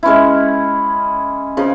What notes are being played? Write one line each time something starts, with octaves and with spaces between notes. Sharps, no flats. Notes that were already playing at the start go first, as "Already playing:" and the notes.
G#3 C#4 E4
C#3 F3